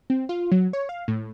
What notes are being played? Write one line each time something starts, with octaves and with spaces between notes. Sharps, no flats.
C4
F4
F#3
C#5
F5
A2